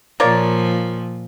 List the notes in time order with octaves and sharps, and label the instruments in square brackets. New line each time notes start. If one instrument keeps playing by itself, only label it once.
[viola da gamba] A#2 F3 [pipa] A#3 C#5 D5